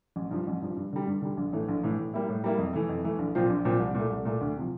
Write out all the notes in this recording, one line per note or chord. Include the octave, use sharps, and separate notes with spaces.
A1
G2 F3
A1
G2 F3
G2
D3 G3
G2
D3 G3
A#1
A2 E3 A3
A#1
A2 E3 A3
A2
G3 A#3 E4
A2
G3 A#3 E4
F2
E3 A3
F2
E3 A3
A#1
A#2 F3 C4 F4
A#1
A#2 F3 C4 F4
C2
A#2 A3
C2
A#2 A3
D2
C3 F3